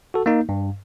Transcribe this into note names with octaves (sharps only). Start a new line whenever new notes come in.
F#4 A4
A#3 D#4
G2